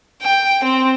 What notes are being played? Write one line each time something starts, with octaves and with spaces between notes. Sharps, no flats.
G5
C4